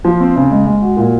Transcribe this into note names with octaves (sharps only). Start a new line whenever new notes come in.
F3
C4
C#3
G#3
G#3
F#4
A#2